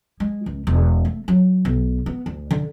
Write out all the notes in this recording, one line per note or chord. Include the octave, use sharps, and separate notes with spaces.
G#3
C#2
E1
A3
F#3
B1
B3
D2
D3